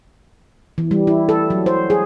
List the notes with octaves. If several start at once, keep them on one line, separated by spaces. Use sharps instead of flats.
E3
G3
E4
A4
F#3
C5
G#4